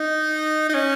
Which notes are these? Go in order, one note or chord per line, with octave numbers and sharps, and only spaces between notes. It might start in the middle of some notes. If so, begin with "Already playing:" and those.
Already playing: D#4
D#4
C#4